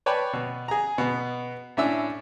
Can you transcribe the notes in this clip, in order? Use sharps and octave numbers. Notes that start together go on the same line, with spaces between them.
B4 C#5 D5 G5 A5 B5
B2
G#4 A#5
B2 B3
A2 C#4 D4 E5 E6